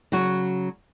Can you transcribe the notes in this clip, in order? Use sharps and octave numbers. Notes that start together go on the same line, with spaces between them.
C#3 F#3 F#4